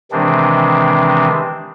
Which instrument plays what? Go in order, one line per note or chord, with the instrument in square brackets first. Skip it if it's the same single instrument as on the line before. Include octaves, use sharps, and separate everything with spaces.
[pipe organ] C3 D#3 E3 G#3 C4 D4